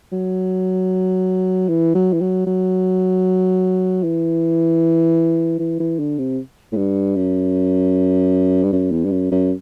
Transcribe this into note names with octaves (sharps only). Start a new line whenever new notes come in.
F#3
E3
F#3
E3
F#3
F#3
E3
E3
E3
D3
C3
A2
G2
F#2
G2
F#2
E2
G2
F#2
F#2